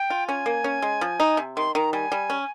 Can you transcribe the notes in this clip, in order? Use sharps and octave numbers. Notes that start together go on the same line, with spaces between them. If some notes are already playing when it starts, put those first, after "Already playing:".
Already playing: G5
F4
C#4 G#5
A#3
C#4
G#3
F3
D#4
C3
D#3 C6
D#3 A#5
G3 G#5
G3
C#4